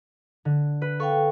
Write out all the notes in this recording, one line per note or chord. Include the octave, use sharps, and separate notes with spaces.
D3
B4
A4 F5 G5 C#6